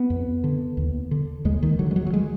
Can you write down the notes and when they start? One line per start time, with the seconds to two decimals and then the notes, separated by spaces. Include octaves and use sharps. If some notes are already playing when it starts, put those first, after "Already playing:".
Already playing: B3
0.10 F2
0.44 D3
0.77 D#2
1.11 D3
1.45 D#2 G#3
1.63 D#3
1.79 D3 F#3
1.91 G#3
1.96 F#3
2.07 F#3
2.14 G#3